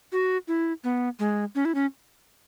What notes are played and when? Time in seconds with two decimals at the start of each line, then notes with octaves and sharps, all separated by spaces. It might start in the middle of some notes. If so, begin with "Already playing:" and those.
0.12 F#4
0.48 E4
0.84 B3
1.19 G#3
1.55 C#4
1.65 E4
1.75 C#4